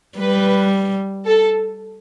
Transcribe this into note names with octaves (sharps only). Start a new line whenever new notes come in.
G3 B4
A4